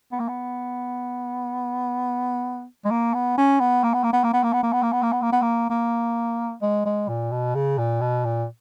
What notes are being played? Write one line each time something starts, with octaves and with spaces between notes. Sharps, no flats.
B3
A#3
B3
G#3
A#3
B3
C#4
B3
A#3
B3
A#3
B3
A#3
B3
A#3
B3
A#3
B3
A#3
B3
A#3
B3
A#3
B3
A#3
A#3
G#3
G#3
A#2
B2
C#3
A#2
B2
A#2